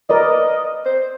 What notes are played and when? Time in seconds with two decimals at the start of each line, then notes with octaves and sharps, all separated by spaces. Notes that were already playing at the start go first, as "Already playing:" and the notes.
0.10 A#4 B4 D5 D#5
0.85 C5